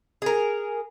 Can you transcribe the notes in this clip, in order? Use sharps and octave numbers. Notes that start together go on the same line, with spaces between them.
G#4 A#4